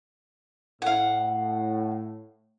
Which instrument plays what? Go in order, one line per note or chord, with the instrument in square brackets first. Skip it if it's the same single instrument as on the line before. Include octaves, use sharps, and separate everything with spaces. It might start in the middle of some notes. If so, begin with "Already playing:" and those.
[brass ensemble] A2 [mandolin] F5 F#5